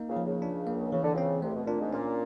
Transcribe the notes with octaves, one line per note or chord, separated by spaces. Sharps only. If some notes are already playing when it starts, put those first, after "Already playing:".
Already playing: A#3 D#4
C#2 C#3
F3
C#2 C#3
D4
A#3
C#3 E3
D3
C#2 C#3 C4
C2 C3 A3
B2
A#2 D4
G#2
A#2 C#4